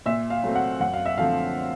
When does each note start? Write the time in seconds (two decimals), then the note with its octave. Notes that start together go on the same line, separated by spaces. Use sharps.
0.06 A#2 E5
0.30 F5
0.43 F#3 A3 C4
0.56 F#5
0.80 F#2 F#5
0.93 F5
1.05 E5
1.18 D3 F3 A3 C4 F5